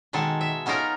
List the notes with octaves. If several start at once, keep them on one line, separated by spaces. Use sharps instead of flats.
B2 D#3 G#3 A4
E5
B3 C#4 D#4 F4 A#4